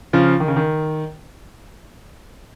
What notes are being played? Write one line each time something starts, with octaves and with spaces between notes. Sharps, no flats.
C#3 F3
D#3
C#3
D#3